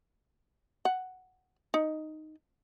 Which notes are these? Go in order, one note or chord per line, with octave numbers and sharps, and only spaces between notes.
F#5
D#4